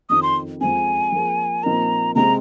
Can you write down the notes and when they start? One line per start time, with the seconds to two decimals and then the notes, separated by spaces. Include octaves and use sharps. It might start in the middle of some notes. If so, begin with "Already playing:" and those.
0.09 F2 D#3 C4 D#6
0.23 C6
0.61 F2 F3 G#3 C4 G#5
1.12 F3 A#3 G#4
1.63 A#2 F3 C4 D#4 A#4 A#5
2.15 C3 G#3 C4 A#5